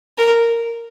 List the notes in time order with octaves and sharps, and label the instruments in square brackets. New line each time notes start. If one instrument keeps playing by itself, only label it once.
[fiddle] A#4